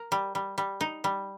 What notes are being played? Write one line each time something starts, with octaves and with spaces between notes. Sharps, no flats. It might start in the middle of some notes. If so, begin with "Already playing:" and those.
Already playing: A#4
G3
G3
G3
D#4
G3